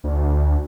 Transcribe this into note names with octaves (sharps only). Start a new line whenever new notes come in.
D2